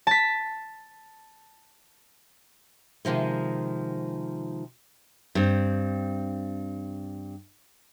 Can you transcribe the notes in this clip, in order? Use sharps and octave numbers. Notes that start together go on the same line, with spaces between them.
A5 B6
C3 D#3 F3 G#3
G2 C4